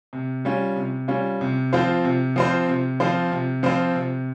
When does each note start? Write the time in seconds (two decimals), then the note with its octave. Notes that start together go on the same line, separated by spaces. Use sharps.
0.13 C3
0.45 G3 C#4 F4
0.76 C3
1.08 G3 C#4 F4
1.41 C3
1.73 F3 C4 F4 C5
2.04 C3
2.36 F3 C4 F4 C5
2.69 C3
3.00 F3 C4 F4 C5
3.32 C3
3.63 F3 C4 F4 C5
3.95 C3